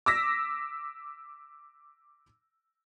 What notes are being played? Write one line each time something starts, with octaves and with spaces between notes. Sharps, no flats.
D6 E6 A#6 B6